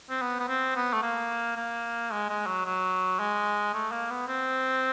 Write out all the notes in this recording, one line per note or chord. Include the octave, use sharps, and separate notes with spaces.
C4
B3
B3
C4
B3
A3
A#3
A#3
G#3
G#3
F#3
F#3
G#3
A3
A#3
B3
C4